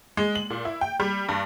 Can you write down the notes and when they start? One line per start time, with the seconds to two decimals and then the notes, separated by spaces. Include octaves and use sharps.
0.17 G#3
0.35 F#7
0.50 A#2
0.65 E4
0.81 G5
1.00 G3
1.29 G2